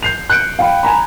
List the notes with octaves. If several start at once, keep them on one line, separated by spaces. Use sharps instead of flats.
G6 C7 F7
F#6 G6 C#7 D7
F5 G5 B5
G#5 A#5 B5